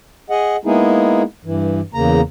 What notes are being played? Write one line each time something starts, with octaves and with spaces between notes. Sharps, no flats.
G#4 D#5 F#5
G#3 A#3 B3 D#4 E4 G#4
G2 E3
E2 C#3 A#3 A#5